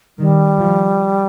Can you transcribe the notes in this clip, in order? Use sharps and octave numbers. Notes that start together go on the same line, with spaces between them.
D#3 G3
F3